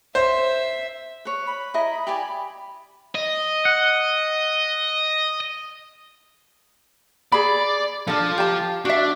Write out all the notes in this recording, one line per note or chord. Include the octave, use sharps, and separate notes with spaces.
C5 E5
B4 C#5
B5
E4 D#5 A#5
G4 D5 G#5
D#5
F#5
G#4 D5 B5
F3 D4 F4 A4
G4 A5
D4 F#4 E5